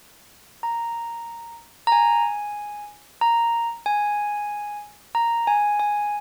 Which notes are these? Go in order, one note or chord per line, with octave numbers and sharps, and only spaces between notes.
A#5
A#5
G#5
A#5
G#5
A#5
G#5
G#5